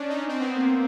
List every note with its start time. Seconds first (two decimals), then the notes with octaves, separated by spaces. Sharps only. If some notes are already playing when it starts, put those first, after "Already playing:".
Already playing: C#4 D4
0.09 D#4
0.28 C4
0.39 B3
0.55 A#3
0.65 B3